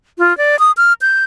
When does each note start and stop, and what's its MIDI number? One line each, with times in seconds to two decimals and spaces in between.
0.19 0.36 65
0.38 0.59 74
0.59 0.72 87
0.77 0.93 89
1.02 1.25 91